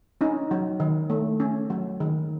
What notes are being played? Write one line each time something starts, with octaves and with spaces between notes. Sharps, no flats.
C#4 D#4
F#3
D#3
A3
C#4
F#3
D#3